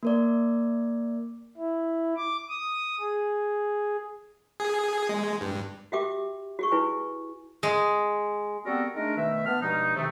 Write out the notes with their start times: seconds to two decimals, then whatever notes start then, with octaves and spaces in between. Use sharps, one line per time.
0.03 A#3 A#4 D5
1.57 E4
2.16 D6
2.49 D#6
3.00 G#4
4.60 G#4
5.09 G#3
5.41 G2
5.92 F#4 G4 E5 G5 D6
6.59 F#4 G#4 C#6
6.72 E4 B4 G#5
7.63 G#3
8.65 G3 B3 C4 F#4 A4 A#4
8.95 G#3 A3 D4 D#4 A#4
9.17 B2 D#3 A3 E5
9.46 B3 D4 F6
9.61 G2 B2 F3 G#3 D#4
9.96 C3 D#3 A3